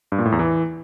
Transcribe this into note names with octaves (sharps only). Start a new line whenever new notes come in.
G2
A#2
A2
E2
E3